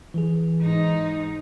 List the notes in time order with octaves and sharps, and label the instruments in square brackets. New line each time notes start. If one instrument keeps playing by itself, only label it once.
[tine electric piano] E3 G#4
[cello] G#2 D#4